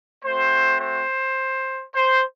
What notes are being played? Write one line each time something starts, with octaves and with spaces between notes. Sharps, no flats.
A3 C4 F#4 C5
C5
C5